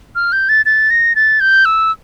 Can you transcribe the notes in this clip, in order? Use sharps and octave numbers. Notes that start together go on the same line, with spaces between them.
F6
G6
A6
A6
A#6
A6
G6
E6